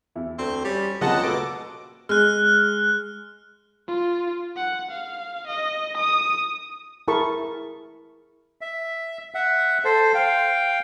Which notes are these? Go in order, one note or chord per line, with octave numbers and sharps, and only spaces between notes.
E2 E4
D2 C4
G3 C#4
C#2 A#2 C#3 F#3 C4 D#5 F#5 A5
B2 A3 D6 E6
G#3 F6 F#6
F4
F#5
F5
D#5
D#6
E4 G#4 A#4 A5 B5 C#6
E5
E5 F#5
A4 C5
F5 G5